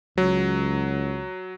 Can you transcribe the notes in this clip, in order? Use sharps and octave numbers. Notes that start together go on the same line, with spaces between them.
C#2 F#3